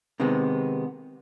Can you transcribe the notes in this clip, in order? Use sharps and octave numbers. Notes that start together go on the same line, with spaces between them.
C3 D#3 G#3 B3